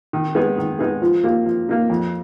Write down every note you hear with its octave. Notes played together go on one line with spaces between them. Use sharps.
D#3
G#3 B3 D#4 G#4
D#3
G#3 B3 D#4 G#4
F3
A#3 D#4 G4
F3
A#3 D#4 G4
F2